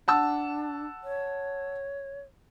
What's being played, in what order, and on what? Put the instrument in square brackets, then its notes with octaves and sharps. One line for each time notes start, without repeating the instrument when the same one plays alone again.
[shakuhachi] D4 [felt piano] F#5 A5 E6
[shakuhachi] C#5